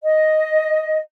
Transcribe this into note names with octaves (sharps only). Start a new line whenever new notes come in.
D#5